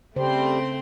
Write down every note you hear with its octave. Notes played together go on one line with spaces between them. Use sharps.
C#3 G3 A3 C4 C5 C6